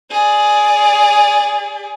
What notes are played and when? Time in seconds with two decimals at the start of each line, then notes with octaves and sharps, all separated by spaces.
0.11 G#4 D5